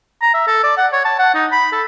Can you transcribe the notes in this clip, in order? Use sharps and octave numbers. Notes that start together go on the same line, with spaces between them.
A#5
E5
A4
D5
F#5
C#5
A5
F#5
D#4
B5
A4